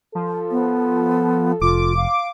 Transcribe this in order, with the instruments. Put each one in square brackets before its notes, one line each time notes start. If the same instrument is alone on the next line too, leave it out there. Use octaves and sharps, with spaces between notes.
[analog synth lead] F3 [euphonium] A4
[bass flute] B3
[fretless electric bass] F1 [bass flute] F4 [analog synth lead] D6
[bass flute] F5